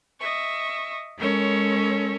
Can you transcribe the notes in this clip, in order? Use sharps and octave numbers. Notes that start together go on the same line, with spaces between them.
D#5 E5 C#6
G#3 C#4 A4 A#4 C#5